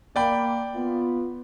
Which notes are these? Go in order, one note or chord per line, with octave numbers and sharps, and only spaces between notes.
A#3 D5 G5 B5
B3 F4